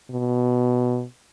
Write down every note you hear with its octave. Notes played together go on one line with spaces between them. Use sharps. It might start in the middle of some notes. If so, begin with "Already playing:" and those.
B2